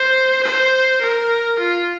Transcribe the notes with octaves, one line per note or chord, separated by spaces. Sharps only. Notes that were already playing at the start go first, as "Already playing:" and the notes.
Already playing: C5
C5
A#4
F4